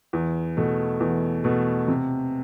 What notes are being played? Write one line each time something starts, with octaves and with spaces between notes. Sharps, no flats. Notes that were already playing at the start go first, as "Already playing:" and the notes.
E2
B2 A3
E2
B2 A3
C3